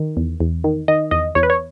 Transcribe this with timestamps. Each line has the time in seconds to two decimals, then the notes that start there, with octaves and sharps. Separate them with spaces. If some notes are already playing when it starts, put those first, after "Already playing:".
Already playing: D#3
0.17 E2
0.40 E2
0.64 D#3
0.88 D#3 D#5
1.11 E2 D#5
1.35 E2 C#5
1.43 B4
1.50 C#5